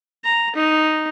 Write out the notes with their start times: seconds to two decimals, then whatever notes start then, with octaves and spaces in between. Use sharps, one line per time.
0.25 A#5
0.55 D#4